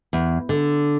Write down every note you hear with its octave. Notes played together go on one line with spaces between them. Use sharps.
E2
D3